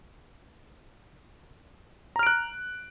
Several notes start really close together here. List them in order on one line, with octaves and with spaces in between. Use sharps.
A#5 F6 D7 F#6